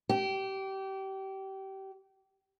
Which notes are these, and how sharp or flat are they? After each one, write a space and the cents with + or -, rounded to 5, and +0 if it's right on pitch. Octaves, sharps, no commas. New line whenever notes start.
G4 -25